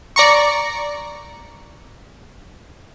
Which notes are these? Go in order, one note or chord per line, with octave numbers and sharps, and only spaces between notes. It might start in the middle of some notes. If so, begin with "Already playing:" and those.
D5 A#5 C#6